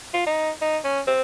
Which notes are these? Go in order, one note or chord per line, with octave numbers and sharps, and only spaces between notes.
F4
D#4
D#4
C#4
C4